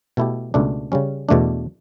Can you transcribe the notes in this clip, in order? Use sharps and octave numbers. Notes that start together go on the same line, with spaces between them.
B2 A3 E4 G4
C#2 B2 A3 D4
C#3 G3 C#4
E2 B2 A3 D4